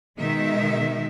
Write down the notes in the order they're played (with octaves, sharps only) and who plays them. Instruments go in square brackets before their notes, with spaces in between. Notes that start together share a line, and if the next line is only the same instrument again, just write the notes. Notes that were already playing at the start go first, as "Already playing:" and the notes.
[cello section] B2 D#3 G#3 D#4 E5